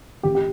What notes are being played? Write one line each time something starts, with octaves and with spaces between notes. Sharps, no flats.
A1 G4
G4